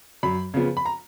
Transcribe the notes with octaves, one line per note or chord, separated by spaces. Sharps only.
F#2 B5
C#3 F3 B3
B5
A#5